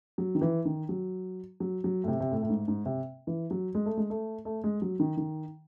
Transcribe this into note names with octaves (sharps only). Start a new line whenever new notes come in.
F#3
D#3
E3
D#3
F#3
F#3
F#3
A2
C3
C3
A2
A2
G#2
G#2
C3
E3
F#3
G#3
A3
G#3
A3
A3
G#3
F#3
D#3
D#3